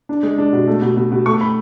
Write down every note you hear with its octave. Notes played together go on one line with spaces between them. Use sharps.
D4
G#3
D4
B2
A3
B2
B2
B2
A3 C#6
B5